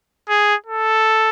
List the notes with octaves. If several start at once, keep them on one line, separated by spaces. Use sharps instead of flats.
G#4
A4